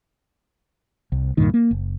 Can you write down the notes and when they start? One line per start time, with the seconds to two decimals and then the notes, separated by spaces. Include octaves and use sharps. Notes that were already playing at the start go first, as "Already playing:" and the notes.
1.12 C2
1.37 C#2 G2 A#2 D#3
1.54 A#3
1.71 F#1